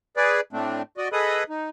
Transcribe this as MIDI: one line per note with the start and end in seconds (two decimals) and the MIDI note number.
0.17 0.41 68
0.17 0.41 71
0.17 0.41 74
0.53 0.82 45
0.53 0.82 57
0.53 0.82 60
0.53 0.82 62
0.97 1.09 66
0.97 1.09 74
0.97 1.09 75
1.12 1.44 68
1.12 1.44 69
1.12 1.44 71
1.12 1.44 75
1.12 1.44 83
1.12 1.44 87
1.50 1.70 63